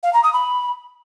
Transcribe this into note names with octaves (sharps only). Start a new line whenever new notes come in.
F5
A#5
D#6
B5